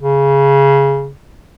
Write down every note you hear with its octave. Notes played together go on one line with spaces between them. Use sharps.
C#3